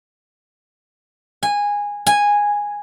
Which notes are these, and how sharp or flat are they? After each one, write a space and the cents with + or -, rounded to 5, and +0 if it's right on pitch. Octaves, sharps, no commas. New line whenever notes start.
G#5 -15
G#5 -10